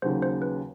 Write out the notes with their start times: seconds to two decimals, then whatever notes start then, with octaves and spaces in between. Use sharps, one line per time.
0.02 D#2 C#3 F#3 C5
0.22 C5
0.42 B4